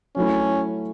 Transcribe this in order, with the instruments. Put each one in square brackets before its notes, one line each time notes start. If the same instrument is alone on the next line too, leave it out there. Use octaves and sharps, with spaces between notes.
[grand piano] F#3 A3 E4 [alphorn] C#4